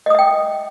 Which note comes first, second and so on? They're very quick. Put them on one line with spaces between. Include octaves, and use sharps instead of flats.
D#5 D#6 E5 G5